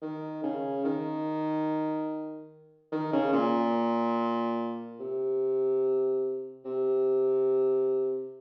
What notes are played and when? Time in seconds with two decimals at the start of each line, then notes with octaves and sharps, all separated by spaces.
0.02 D#3
0.43 C#3
0.85 D#3
2.92 D#3
3.12 C#3
3.33 A#2
4.99 C3
6.65 C3